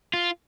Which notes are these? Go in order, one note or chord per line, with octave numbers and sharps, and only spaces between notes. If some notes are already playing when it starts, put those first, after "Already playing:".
F4